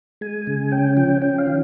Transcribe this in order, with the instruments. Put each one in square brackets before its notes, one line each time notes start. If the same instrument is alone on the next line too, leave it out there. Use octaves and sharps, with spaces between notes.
[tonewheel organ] G#3 G#5
C#3
C#4 G5
F3 G5
C#4 G5
F5
D#3